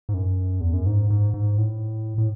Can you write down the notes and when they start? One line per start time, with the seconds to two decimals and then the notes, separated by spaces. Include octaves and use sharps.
0.09 G#2
0.14 F#2
0.60 E2
0.73 F#2
0.86 G#2
1.10 G#2
1.34 G#2
1.58 A2
2.18 A2